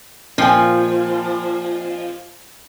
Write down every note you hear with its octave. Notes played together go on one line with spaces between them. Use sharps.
A#2 F3 G5 G#5